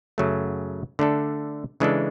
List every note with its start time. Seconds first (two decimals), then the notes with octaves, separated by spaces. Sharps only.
0.18 F#2 C#3 F#3 A3
0.99 D3 A3 D4 A4
1.80 C#3 E3 G#3 D4 A4